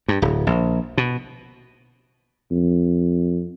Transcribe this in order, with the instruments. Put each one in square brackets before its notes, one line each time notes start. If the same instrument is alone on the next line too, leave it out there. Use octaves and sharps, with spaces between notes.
[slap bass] G2
D1
A#1
B2
[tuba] F2